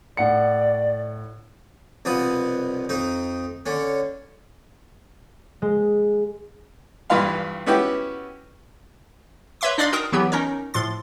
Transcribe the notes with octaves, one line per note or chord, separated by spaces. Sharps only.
A2 D5 F#5 C#7
C2 B2 F3 B3 D#6
F2 D#4
D3 C#4
G#3
A#1 G2 E3 B4 F5 C6
B3 C#4 E4 F#4 G4
B4 C#5 E5 C6 D6
D4 D#4 D5 D#5 F5 C6
F#4 A#4 G5 D#6
E3 F#3 B3 E4 G4
C#4 D#4 A#4 C#5
A2 F3 C6 A6